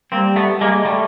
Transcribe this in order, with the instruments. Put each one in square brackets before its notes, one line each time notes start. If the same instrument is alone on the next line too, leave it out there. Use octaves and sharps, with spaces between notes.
[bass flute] G3 [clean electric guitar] A#3 C4
[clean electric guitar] A3 B3
G#3 A#3
G3 A3